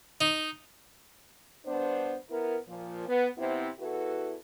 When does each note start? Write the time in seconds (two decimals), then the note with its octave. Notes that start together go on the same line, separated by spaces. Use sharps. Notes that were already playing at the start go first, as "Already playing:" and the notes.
0.21 D#4
1.66 G2 B3 D4 C5
2.29 B3 E4 A#4
2.68 A#2 F3
3.08 B3
3.37 C3 B3 C4 E4
3.79 E2 E4 F#4 A4 B4